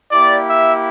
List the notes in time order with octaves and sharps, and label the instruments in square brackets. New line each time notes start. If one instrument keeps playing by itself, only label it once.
[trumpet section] A#3 E4 G4 D5
E5